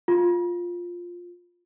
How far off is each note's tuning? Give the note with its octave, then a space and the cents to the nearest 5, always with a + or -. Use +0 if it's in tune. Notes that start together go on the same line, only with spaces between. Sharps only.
F4 +5